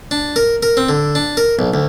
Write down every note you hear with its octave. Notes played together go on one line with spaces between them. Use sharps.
D4
A#4
A#4
C4
D3
D4
A#4
B1
D2